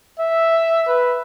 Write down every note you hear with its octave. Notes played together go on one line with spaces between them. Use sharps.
E5
B4